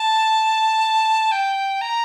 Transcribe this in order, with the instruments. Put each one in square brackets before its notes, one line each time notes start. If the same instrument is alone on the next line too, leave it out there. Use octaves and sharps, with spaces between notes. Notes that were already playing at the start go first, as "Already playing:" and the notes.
Already playing: [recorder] A5
G5
A#5